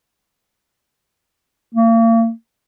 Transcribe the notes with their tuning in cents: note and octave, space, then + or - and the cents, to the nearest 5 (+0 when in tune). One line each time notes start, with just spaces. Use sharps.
A#3 -40